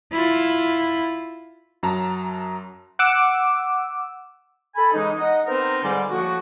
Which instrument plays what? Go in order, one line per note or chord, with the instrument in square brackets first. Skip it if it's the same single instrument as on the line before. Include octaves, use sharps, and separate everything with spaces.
[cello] E4 F4
[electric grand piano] F#2 F#3 A5 A#5
[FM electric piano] F#5 D6 E6
[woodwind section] A4 G#5 B5
C#3 E3 G#3 D#4
D#4 D#5 F#5
B3 C4 D#4 A#4 C5
G#2 D3 G3 F4 D5 G#5
A2 F3 A#3 F#4